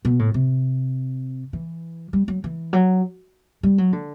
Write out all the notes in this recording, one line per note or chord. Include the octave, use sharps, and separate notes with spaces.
B2
A2
C3
E3
G3
F#3
E3
F#3
G3
F#3
D3